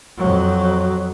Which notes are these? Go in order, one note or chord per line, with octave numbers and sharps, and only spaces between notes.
F2 F#3